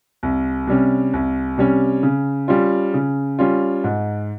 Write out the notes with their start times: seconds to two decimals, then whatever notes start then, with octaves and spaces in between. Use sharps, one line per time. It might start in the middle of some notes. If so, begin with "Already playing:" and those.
0.23 C2
0.67 C3 G3 C#4
1.13 C2
1.58 C3 G3 C#4
2.03 C#3
2.48 G3 C#4 F4
2.94 C#3
3.39 G3 C#4 F4
3.84 G#2